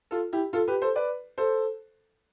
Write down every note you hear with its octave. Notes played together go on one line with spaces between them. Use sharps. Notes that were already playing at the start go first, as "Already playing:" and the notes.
F4 A4
E4 G4
F4 A4
G4 B4
A4 C5
B4 D5
A4 C5